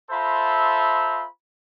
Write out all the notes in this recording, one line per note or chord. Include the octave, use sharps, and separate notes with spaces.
F4 A4 C5 E5 A#5 B5